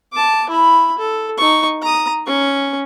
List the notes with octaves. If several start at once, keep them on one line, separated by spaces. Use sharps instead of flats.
A5 D6
E4 B5
A4
D#4 C#6
A#5 D#6
C#4 C#6